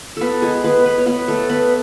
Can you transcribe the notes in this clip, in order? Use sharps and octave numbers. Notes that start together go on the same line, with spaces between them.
B3 A4 B4
G#3 G#4
B3 B4
B3 B4
C#5
B3 B4
A3 A4
B3 B4